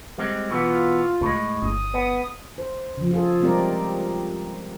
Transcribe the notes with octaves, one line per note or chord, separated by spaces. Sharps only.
G3 G#3 C4
B2 E3 B3 F4
C#2 A2 G#3
G1 D#6
B3
C5
C#3 F3
F4 G#4 A4
G3 G#3 C4 G4 A#4 D5